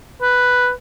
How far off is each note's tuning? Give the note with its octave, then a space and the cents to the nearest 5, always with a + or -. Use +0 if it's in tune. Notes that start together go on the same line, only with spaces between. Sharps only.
B4 +0